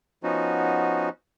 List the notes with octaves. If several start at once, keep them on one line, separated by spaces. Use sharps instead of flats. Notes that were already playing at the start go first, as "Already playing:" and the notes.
F3 B3 C#4 D#4 F#4